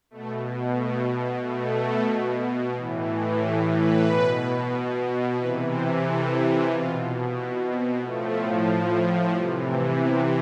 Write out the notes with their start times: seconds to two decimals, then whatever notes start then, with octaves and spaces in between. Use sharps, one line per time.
0.11 B2 A3
0.76 A3
1.42 B2 A3
2.74 A2 E3
3.39 G4
3.73 B4
4.06 B2
5.37 C3 E3 B4
5.70 C5
6.03 A4
6.69 B2 F4
7.35 E4
7.68 C4
8.01 A2 F3 A3
9.32 C3 E3 G3
9.65 A3
9.98 B3